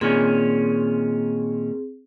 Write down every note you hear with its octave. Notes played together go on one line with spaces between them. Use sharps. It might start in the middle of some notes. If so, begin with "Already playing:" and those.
A#2 D#3 C4 C#4 G#4